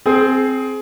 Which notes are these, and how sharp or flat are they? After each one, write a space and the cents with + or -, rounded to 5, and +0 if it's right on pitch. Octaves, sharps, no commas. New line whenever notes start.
C4 +0 G#4 +25